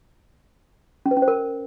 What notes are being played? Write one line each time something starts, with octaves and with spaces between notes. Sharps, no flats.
C#4
B4
C#4
C5
A#4